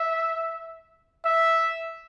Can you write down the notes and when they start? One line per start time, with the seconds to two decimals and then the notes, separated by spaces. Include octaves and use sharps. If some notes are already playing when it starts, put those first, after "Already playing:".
Already playing: E5
1.25 E5